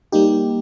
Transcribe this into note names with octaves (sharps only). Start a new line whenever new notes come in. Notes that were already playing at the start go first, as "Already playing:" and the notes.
G3 A#3 D#4 G4